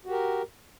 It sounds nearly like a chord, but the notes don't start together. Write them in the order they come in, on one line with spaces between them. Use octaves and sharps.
F#4 G4 A#4